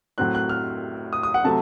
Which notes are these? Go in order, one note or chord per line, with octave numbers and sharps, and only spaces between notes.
A2 F#3 C4 F#6
F#6
F6
D#6
D#6
F#5
C3 F#3 A3 A5